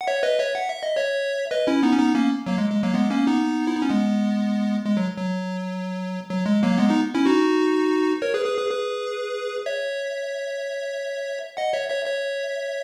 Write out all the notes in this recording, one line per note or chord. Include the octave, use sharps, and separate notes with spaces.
F#5
C#5 E5
B4 D#5
C#5 E5
F#5
E5
D#5
C#5 E5
B4 D#5
C#4 E4
B3 D#4
C#4
B3 D#4
A#3 C#4
F#3 A#3
G#3
G#3
F#3 A#3
G#3 B3
A#3 C#4
B3 D#4
E4
D#4
C#4
G#3 B3
G#3
F#3
F#3
F#3
G#3
F#3 A#3
G#3 B3
B3 D#4
C#4 E4
D#4 F#4
A#4 C#5
G#4 B4
G#4 B4
G#4 B4
G#4 B4
C#5 E5
D#5 F#5
C#5 E5
C#5 E5
C#5 E5